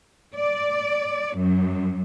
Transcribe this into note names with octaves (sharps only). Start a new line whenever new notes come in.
D5
F#2